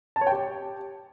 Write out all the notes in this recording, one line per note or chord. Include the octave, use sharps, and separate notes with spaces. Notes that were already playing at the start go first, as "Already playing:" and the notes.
A5
C#5
G5
G4